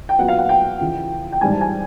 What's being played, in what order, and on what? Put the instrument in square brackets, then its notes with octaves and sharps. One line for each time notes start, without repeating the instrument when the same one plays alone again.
[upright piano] G5
A#2 F#3 B3 F#5
F5
F#5
G5
F2 C#3 E3
G5
G#2 E3 G3 C4 G#5
A5
G#5